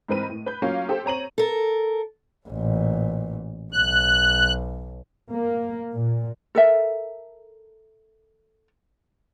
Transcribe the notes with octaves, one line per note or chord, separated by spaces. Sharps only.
G#2 E3 C4 A#4 B4 D#7
A2
B4 G6
F#3 A#3 C#4 F4 F5
G4 A4 C5
C4 C#5 A#5 D#7 F#7
A4 A#4
A1 A#2
B1 F#6
A#3
A#2
A4 A#4 E5